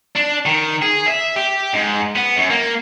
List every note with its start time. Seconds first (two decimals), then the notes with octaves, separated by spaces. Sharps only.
0.16 D4
0.46 D#3
0.82 G#4
1.08 E5
1.36 G4
1.73 G#2
2.16 B3
2.36 F#2
2.50 A#3